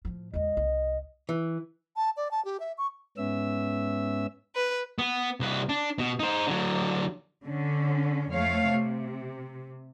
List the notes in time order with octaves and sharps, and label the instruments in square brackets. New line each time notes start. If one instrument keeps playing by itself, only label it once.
[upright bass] A2 F3
[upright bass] E2 G#3 [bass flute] D#5
[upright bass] C2
[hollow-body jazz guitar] E3
[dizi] A5
D5
A5
G4
E5
C#6
[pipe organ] G#2 B3 C#4 E5 E6
[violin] B4
[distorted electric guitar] B3
C2 B4
D4
B2
D#4 C5
D3 F#3
[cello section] D3 C#4
F2 A3 C#5 F5
C3